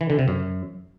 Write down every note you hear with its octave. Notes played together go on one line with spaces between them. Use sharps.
E3
D3
C3
F#2